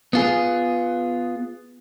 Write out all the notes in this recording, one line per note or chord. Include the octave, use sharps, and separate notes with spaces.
B3 F4 G#4